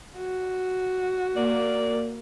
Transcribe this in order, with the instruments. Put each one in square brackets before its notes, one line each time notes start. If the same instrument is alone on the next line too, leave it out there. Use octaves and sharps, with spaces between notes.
[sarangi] F#4
[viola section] A#3 [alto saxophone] D5